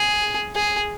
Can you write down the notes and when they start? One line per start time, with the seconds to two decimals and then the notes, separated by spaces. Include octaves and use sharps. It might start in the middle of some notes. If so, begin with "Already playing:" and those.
Already playing: G#4
0.55 G#4